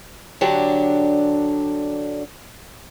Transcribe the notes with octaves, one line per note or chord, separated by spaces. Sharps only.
D3 F#3 D4 G4